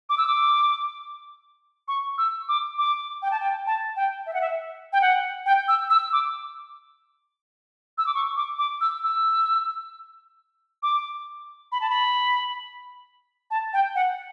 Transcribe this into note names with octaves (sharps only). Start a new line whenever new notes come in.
D6
E6
D6
C#6
E6
D6
D6
G5
A5
G5
A5
G5
E5
F#5
E5
G5
F#5
G5
E6
E6
D6
E6
D6
C#6
D6
D6
E6
E6
D6
B5
A5
B5
A5
G5
F#5